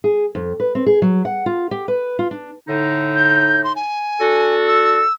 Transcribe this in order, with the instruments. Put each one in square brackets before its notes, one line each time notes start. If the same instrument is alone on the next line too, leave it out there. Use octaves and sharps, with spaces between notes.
[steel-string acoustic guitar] G#4
F2
B4
C4
G#4
F#3
F#5
F4
G4
B4
F4
D4
[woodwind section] A2 D3 D#4
[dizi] G6
C6
G#5
[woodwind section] D4 F#4 A4
[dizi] E6